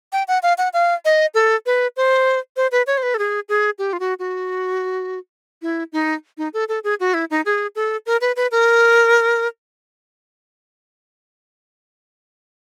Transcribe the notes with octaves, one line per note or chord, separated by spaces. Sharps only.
G5
F#5
F5
F#5
F5
D#5
A4
B4
C5
C5
B4
C#5
C5
B4
A4
G#4
G#4
G4
F4
F#4
F#4
E4
D#4
D#4
A4
A4
G#4
F#4
E4
D#4
G#4
A4
A#4
B4
B4
A#4